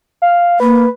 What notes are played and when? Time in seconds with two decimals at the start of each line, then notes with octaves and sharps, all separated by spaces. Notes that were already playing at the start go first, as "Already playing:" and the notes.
0.22 F5
0.60 A#3 B4